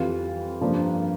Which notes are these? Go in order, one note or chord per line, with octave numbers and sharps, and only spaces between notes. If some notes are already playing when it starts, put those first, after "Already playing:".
Already playing: F2 E3 G3 F4
G2 F3 A#3 D4